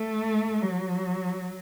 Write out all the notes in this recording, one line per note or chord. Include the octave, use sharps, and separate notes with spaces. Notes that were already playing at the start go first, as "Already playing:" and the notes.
Already playing: A3
F#3